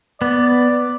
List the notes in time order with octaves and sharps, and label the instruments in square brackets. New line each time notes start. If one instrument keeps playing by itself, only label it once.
[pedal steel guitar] B3 [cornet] D5